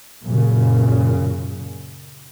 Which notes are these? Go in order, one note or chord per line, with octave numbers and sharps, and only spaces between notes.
F#2 A#2 C#3